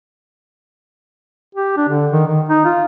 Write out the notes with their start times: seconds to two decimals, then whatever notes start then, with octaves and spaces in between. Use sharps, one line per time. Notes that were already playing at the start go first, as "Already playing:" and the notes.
1.55 G4
1.77 D4
1.89 D3
2.12 D#3
2.27 D#3
2.49 D#4
2.65 F4